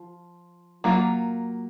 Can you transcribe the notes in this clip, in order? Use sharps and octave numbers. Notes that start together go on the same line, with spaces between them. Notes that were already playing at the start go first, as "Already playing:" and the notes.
Already playing: F3
F#3 A#3 F4